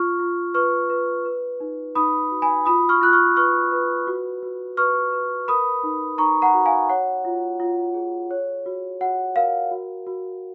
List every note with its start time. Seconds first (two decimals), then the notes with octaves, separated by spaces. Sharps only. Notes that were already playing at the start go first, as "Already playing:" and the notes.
Already playing: F4 C#6 F6
0.19 F4
0.54 B4 C#6 F6
0.90 B4
1.25 B4
1.60 D#4
1.95 D#4 B5 D#6
2.31 F#4
2.42 G#5 B5
2.65 F4 B5 D#6
2.89 C#6 F6
3.01 F4 F#6
3.13 C#6 F6
3.36 B4 C#6 F6
3.72 B4
4.07 F#4
4.43 F#4
4.77 B4 C#6 F6
5.13 B4
5.48 A#4 B5 D#6
5.83 D#4
6.18 D#4 A#5 C#6
6.42 F#5 A#5
6.54 F#4
6.66 F5 G#5
6.89 C#5 F#5
7.25 F4
7.60 F4
7.94 G#4
8.31 C#5
8.66 F#4
9.01 F#4 F#5
9.36 A#4 F5
9.71 F#4
10.07 F#4